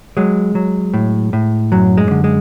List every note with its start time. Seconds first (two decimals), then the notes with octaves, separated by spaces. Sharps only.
0.17 F#3 G#3
0.55 F#3
0.94 A2
1.33 A2
1.72 F#2 F#3
1.97 G#3
2.11 D3
2.24 G#3